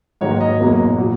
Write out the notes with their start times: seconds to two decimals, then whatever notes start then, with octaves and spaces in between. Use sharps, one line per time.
0.21 G#2 D#3 F#3 A#3 C#5
0.41 D#5
0.60 F#1 E2 B2 F#3 A#3
0.98 A#2 F#3